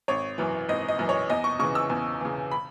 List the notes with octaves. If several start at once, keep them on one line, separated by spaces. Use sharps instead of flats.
G#1 C#5
F#2 E3
G#1 D#5
D#5
F#2 E3
C#5
E2 D#5
C#6
C#3 E3 C#6
E6
E2
C#3 E3
B5